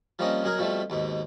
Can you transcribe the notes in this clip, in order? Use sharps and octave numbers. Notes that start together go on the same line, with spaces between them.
F3 G3 A#3 C4 C#4 D#5
B2 F#3 G#4 A#4
B2 F3 G3 A3 C4
D#2 G#2 B2